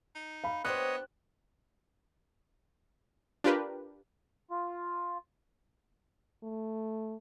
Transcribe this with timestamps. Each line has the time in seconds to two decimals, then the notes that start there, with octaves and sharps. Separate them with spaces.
0.15 D#4
0.44 F5 B5
0.65 B3 D4 G4 C5 C#5 D#5 D#6 F#6
3.44 D4 F4 G4 A#4 B4
4.51 F4
6.43 A3